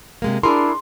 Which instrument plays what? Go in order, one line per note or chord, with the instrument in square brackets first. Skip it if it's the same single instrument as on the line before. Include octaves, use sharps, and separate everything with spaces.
[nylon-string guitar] C3 G#3 A#3
[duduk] D4 [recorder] E4 [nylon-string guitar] G#4 A#4 [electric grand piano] C6